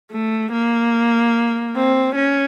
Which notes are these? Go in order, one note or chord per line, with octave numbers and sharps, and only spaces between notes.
A3
A#3
C4
C#4